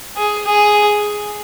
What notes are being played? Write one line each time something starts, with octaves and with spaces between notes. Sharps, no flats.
G#4
G#4